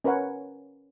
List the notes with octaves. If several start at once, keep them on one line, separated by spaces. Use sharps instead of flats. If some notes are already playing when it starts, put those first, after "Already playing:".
C#4 A#4 B4 C#5 F#5